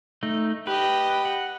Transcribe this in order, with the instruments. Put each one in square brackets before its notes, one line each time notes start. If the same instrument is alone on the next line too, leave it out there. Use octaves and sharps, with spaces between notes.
[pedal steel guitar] A3 D#4
[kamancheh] G4 D#5 [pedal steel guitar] B4
[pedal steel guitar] F#5